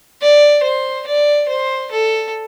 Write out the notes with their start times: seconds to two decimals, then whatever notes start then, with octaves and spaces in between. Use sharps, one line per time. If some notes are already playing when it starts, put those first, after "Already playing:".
0.21 D5
0.63 C5
1.06 D5
1.48 C5
1.91 A4